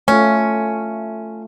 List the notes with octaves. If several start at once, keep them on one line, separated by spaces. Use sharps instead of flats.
A3 C#4 F4